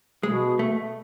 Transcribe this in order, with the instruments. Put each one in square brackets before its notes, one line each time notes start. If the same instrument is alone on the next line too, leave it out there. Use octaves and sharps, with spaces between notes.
[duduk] B2 [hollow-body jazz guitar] G#3
[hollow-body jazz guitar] A3